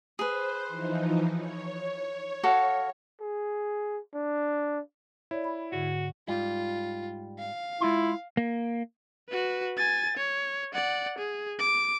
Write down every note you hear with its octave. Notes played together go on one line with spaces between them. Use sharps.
G#4 B4 C5
E3 F3 D#4
C#5
F#4 A4 F5
G#4
D4
E4 C#5 D5
B5
G#2 D3 F#4
G#2 G3 F4
F5
G#3 E4 F4 C6
A#3
F#4 B4
G#5 A6
C#5
D5 F#5
G#4
D6